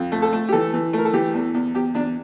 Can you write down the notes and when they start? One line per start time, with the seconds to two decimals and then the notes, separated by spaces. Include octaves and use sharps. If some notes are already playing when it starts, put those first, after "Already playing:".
Already playing: F2
0.12 A3
0.22 A4
0.33 A3
0.49 G4
0.52 E3 A4
0.74 E3
0.93 A3 A#4
1.05 A4
1.13 E3 G4
1.35 E2
1.54 E2
1.74 E2 G4
1.94 E2 D4